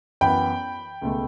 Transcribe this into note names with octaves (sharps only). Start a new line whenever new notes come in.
F#2 E3 B3 G5 B5
C#2 B2 A3